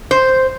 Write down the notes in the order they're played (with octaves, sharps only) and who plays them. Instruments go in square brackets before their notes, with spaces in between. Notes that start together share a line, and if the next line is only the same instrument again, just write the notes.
[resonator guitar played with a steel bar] C5